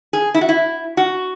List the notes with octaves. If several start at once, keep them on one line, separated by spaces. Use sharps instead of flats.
G#4
E4
F#4
E4
F#4